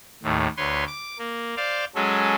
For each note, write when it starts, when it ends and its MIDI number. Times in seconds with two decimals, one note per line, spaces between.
0.23 0.48 39
0.23 0.48 45
0.57 0.84 38
0.57 0.84 71
0.57 0.84 73
0.57 0.84 84
0.87 1.18 86
1.18 1.55 58
1.57 1.85 72
1.57 1.85 74
1.57 1.85 77
1.95 2.36 54
1.95 2.36 56
1.95 2.36 61
1.95 2.36 69